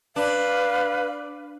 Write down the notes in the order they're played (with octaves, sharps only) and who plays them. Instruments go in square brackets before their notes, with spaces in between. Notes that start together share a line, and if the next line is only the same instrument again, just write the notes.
[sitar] D4 [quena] B4 [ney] F5